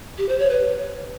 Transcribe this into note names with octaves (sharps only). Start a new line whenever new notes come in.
G4
C5
C#5
B4